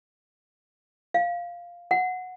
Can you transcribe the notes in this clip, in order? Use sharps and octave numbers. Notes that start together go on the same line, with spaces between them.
F5
F#5